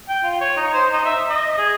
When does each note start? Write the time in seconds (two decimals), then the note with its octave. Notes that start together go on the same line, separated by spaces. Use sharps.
0.09 G5
0.24 F4
0.41 C#5
0.57 D#4
0.74 C5
0.93 D#4
1.05 E5
1.29 D#5
1.58 G#4